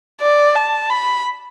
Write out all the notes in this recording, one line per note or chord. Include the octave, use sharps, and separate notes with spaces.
D5
A5
B5